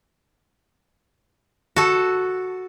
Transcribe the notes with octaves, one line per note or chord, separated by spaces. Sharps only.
F#4 A4